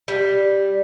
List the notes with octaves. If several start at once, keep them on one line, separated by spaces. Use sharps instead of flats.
G3